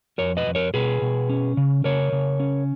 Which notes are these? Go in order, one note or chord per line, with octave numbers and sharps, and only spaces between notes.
F2 A#4 C#5
B4 D#5
F2
A#4 C#5
B2 G#4 B4
B2
C#4
C#3
C#3 A#4 C#5
C#3
C#4